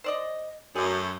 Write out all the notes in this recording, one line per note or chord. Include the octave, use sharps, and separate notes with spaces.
C5 D5 D#5
F#2 A3 G#4